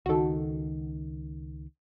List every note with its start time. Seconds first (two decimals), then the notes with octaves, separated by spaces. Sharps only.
0.06 C#2 D#3 F#4 A4